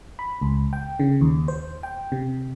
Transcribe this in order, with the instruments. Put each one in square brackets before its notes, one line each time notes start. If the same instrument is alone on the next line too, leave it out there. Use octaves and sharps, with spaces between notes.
[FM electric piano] B5
C#2
G5
C#3
D#2
C5
G5
C3